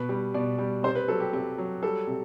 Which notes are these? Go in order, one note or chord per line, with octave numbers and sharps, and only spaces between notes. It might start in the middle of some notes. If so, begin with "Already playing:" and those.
Already playing: B2 B4
G3
B2 D5
G3
C3 C5
B4
F#3 A4
G4
C3 G4
F#3
G3 A4
C3